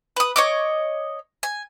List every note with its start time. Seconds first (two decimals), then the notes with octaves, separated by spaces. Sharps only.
0.16 B4 D#6
0.36 C#5 D#5 D6
1.43 G#5